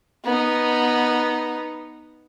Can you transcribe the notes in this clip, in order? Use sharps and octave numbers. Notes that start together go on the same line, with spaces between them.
B3 D#4